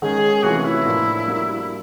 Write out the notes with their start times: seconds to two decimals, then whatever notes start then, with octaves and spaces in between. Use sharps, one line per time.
0.02 D#3 G#3 C#4 G#4
0.43 C3 E3 A3 C#4 F4 F#4
0.65 E4
0.85 A2 F3 A#3 D4 F4
1.26 G3 A#3 D4 F#4